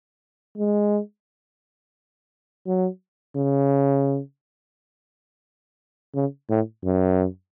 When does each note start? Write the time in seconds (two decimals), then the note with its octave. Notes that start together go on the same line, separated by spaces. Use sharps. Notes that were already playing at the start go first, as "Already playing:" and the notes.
0.58 G#3
2.67 F#3
3.36 C#3
6.15 C#3
6.49 A2
6.84 F#2